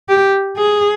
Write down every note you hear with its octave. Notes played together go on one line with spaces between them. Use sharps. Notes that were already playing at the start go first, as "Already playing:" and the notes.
G4
G#4